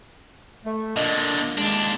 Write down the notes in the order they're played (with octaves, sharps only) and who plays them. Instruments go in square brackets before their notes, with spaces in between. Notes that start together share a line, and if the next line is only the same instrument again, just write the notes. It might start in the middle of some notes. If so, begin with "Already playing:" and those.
[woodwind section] A3
[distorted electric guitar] A#2 D3 [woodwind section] A#3 D4 D#5
[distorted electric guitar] D#2 D4 [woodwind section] G#3